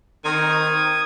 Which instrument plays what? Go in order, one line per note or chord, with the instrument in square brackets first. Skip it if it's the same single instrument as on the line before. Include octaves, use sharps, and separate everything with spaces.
[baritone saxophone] D#3 [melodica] C4 D#4 A#4 [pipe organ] D#6 G#6